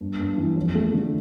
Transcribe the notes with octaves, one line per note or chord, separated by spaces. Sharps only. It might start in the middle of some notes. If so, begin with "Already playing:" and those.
G2
G2
E3
F2
A3
D3